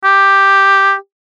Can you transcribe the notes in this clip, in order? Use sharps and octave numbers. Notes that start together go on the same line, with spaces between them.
G4